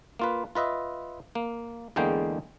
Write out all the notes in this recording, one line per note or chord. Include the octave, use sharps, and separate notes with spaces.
A#3 F4 B4
F4 B4 D#5 E5
A#3
E2 D3 G#3 A#3 G5